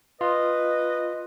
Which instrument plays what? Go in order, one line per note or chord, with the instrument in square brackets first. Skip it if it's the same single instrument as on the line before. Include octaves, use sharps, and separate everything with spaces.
[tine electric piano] F4 [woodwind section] B4 D#5